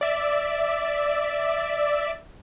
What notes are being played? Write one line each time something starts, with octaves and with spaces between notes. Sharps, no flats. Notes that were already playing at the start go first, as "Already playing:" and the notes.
D5 E5